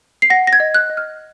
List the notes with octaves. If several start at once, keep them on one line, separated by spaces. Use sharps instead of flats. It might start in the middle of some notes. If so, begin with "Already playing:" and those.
C7
F#5 A#6
A#6
G#6
D#5
F#6
D#5
F6